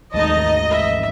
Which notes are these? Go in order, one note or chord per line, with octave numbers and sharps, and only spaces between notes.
G#1 D#2 G#3 A3 D#4 D#5 A5
E5